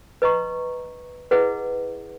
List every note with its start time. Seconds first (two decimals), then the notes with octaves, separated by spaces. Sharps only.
0.22 B4 D#5 A#5 C#6
1.31 E4 G#4 B4 D#5 F#5